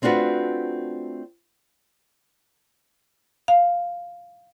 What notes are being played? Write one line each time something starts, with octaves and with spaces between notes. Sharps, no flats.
A3 C4 D4 F4 F#4 B4
F5